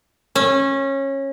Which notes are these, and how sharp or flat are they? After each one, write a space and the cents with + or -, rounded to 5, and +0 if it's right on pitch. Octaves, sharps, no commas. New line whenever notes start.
C#4 -20